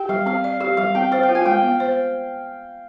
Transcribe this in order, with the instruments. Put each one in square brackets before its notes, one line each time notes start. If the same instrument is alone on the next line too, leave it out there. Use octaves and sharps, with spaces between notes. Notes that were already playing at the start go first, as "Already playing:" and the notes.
Already playing: [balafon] G4 [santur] G5
[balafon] G3 [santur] F5
[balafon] C4 [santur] F5
[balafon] D5
[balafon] G4 [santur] F5
[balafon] G3 [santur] F5
[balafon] C4 [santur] G5
[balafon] C5 [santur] F5
[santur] G5
[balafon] F4
[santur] G#5
[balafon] G#3 [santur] G5
[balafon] B3
C5